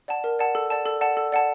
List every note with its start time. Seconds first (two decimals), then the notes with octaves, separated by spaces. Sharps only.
0.08 D5 F#5 A5
0.24 A#4
0.39 D5 F#5 A5
0.55 A4
0.70 D5 F#5 A5
0.86 A4
1.01 D5 F#5 A5
1.17 A4
1.32 D5 F#5 A5